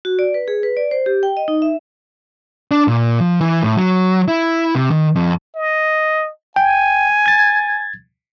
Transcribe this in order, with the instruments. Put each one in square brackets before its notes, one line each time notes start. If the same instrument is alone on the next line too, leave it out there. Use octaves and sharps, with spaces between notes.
[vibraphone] F#4
D5
B4
G#4
B4
D5
C5
G4
G5
D#5
D#4
E5
[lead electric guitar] D4
A#2
F3
E3
A2
F#3
E4
C3
D#3
F2
[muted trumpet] D#5
[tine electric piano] G5 [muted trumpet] G#5
[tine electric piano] G#6 A6